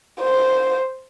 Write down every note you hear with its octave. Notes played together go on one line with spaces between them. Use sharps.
C5